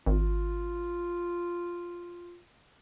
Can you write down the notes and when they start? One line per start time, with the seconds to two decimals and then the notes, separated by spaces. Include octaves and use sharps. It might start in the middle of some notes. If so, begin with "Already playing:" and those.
0.06 G#1 F4